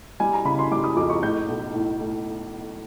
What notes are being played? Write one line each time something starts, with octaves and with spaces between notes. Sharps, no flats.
G3 G#5
A#5
C#3 B5
C6
G3 D6
D#6
F2 D6
C#6
A2 G6
B1
A2
A2